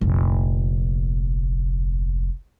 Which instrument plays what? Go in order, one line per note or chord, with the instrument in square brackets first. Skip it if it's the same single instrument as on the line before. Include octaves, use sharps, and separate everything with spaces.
[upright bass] F1 A#1